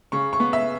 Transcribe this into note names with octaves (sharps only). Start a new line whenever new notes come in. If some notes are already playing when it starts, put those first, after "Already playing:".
C#3 C#6
C#6
B3
E5